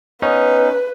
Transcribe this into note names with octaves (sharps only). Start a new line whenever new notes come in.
B3 C#4 D#4 B4